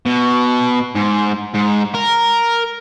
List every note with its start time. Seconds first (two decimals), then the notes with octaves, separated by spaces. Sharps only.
0.06 B2
0.96 G#2
1.54 G#2
1.95 A#4